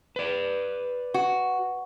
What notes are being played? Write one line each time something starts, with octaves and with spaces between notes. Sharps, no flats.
B4 D5
F#4